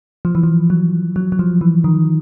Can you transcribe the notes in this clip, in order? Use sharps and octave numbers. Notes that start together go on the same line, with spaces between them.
F3
E3
F3
F#3
F#3
F#3
F3
E3
D#3